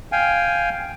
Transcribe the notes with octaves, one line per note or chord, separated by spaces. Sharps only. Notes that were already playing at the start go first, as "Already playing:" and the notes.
F5 G5 G#5